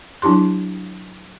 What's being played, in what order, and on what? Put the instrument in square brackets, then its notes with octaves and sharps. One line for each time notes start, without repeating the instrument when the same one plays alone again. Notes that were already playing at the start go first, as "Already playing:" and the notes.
[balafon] F#3 D4 E4 G4 C6